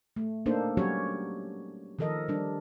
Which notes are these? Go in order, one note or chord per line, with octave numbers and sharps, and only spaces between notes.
A3
A#3 D4 D#4 A4 C5
F#3 G3 C#4 F#4 G4 C#5
D#3 F3 A4 A#4 D#5
G3 D4